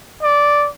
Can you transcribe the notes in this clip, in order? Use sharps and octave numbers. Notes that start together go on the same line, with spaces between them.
D5